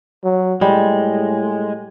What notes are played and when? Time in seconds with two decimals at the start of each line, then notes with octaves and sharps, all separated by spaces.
0.24 F#3
0.61 A2 G3 G#3